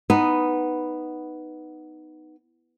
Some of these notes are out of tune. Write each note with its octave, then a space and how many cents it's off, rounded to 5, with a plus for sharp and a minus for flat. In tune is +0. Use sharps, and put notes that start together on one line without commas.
B3 +0 D#4 -5